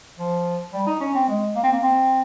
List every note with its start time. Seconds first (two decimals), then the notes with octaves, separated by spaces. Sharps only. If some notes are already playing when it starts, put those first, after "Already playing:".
0.18 F3
0.73 G3
0.87 D#4
1.00 C#4
1.14 C4
1.28 G#3
1.56 A#3
1.63 C4
1.72 A#3
1.83 C4